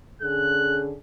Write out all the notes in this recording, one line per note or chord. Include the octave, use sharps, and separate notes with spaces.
D3 C#4 G#4 F#6